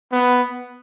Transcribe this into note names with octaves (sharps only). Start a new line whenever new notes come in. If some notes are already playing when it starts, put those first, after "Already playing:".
B3